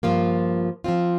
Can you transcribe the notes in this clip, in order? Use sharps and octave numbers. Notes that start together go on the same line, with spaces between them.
G2 F3 A#3 F4
F3 C4 F4